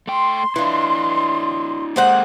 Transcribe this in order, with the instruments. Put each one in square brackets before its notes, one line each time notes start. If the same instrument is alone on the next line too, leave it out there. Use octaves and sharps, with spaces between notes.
[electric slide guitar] A3 G5 [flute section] C6
[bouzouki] E3 F4 [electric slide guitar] D4 E4
[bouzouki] D#3 C5 F#5 [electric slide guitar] G#3 A#3